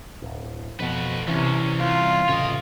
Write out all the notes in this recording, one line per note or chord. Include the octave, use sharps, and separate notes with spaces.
D1
F2 B2 A3 B4
C2 C3 E3 C#4
C2 F4
A1 C#3 C#5 D#5